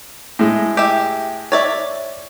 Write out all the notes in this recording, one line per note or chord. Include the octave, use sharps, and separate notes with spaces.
A2 G#3
G4 E5
C#5 D5 E5